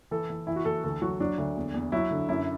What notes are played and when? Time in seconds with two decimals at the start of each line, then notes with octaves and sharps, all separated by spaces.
0.11 E3 A4
0.30 E3
0.47 E3 E4
0.56 F#4
0.65 E3 A4
0.84 D2 A4
1.02 F#3 F#4
1.20 F#3 D4
1.38 D2
1.57 E2
1.74 E2
1.92 F#3 E4
2.11 D3
2.29 F#2 E4